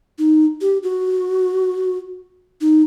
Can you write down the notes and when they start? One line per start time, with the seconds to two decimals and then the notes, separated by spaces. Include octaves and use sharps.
0.19 D#4
0.61 G4
0.83 F#4
2.61 D#4